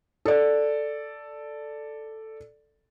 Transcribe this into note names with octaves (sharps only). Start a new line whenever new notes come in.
A4 D5